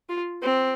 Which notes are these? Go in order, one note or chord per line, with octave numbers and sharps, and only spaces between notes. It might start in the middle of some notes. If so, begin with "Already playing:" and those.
F4
C4